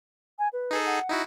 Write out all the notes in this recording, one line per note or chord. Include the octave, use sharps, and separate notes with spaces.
G#5
B4
D#4 G#4 A4
F#5
D#4 E4 F#4